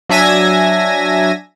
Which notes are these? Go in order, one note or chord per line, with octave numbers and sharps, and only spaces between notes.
F#3 D4 E5 G#5 G#6 A#6